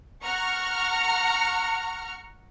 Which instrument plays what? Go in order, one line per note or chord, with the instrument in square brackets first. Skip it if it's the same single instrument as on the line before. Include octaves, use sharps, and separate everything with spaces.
[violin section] F#5 A#5 C#6 F6